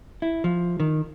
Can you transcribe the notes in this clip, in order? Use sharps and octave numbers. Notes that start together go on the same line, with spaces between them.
E4
F3
D#3